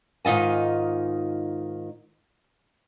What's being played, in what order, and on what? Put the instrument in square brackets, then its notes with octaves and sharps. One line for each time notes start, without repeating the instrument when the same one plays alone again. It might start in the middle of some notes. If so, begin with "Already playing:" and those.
[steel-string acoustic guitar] G#2 D#3 D#4 F4 G#5